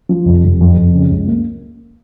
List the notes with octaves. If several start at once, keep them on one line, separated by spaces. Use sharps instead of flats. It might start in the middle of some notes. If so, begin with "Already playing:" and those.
F3
F1
F1
F2
F2
C#3
C#2
A#3